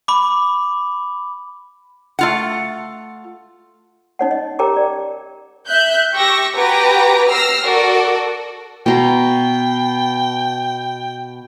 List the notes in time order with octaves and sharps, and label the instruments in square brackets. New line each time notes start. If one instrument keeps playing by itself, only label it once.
[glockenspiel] B5 D6
[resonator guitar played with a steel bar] A3 F4 F#5
[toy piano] C#4 D#4 C#5 F#5
D#5
G4 A#4 C#5 G5 A#5 D6
D5
[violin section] E5 F#6 G6
G4 C#6 E6 A#6
F#4 G4 B4 G#5 A#5 D6
E6 F6 A#6 C7
F#4 A4 A#4 D5
[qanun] B2 A#5 C6 [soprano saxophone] G5